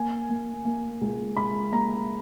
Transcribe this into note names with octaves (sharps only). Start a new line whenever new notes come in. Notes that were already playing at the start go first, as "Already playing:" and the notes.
Already playing: A#3 G#5
A#3
A#3
C#2
C#2 B5
A#3 A#5